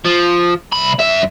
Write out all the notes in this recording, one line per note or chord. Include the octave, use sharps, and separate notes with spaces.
F3
C2 B5
F#2 E5